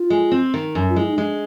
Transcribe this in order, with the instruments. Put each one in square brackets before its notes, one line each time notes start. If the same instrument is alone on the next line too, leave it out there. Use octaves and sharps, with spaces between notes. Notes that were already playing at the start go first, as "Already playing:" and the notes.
Already playing: [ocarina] F4
[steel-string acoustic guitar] G#3
C4
D#3
F#2
[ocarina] F4
[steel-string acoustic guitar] G#3 [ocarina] E4
[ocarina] D#4
[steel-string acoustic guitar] G#3 [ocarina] D4